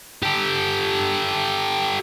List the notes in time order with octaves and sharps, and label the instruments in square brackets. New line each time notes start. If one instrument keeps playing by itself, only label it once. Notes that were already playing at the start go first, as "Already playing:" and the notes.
[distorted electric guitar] G4 A4